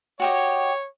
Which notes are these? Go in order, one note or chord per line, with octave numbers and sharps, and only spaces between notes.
F#4 G4 C#5 D#5